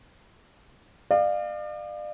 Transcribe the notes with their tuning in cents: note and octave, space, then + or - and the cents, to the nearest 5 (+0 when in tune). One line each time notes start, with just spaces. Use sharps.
D5 +40 F5 +0